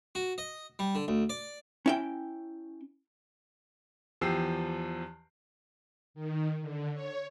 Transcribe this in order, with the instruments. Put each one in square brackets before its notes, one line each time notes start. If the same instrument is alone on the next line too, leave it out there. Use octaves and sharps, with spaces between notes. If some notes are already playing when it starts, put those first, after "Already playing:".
[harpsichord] F#4
D#5
G3
D3
D2
D5
[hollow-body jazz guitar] C#4 E4 G5
[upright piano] E2 F3 G4 E6 C7
[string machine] D#3
D3
C#5